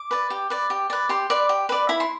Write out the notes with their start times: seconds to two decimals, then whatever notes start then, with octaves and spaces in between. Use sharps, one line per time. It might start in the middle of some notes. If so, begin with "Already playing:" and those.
Already playing: D6
0.11 B4 D5
0.30 G4
0.50 B4 D5
0.70 G4
0.90 B4 D5
1.09 G4 C6
1.30 B4 D5
1.49 G4
1.69 B4 D5
1.89 E4 B5
2.00 C6